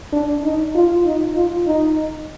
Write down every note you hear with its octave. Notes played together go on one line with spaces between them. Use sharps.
D4
D#4
F4
D#4
F4
D#4